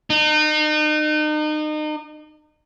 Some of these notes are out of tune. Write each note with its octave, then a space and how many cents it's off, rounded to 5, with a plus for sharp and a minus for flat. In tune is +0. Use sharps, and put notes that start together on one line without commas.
D#4 -35